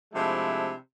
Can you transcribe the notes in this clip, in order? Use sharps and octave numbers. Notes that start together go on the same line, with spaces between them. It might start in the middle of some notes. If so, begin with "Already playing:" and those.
C3 F3 G#3 A3 D4 E4